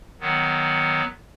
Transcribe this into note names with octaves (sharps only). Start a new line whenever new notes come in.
D#3 F#3 B3